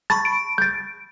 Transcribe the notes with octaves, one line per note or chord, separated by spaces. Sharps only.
A5 B5 C#6 A6
D7
G6 A6